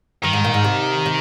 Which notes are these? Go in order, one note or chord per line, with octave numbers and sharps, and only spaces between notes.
G2 D#3
G#2
A#2
G#2
C3
C3